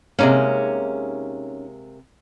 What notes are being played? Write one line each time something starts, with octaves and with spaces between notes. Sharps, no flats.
C3 G#3 A#3 C#4 D#4 G#4